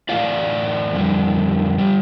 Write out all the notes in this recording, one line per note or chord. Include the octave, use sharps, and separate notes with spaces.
A2 E3 A3 D4 F4 D5 F5
F2 D3 G3
D3 G3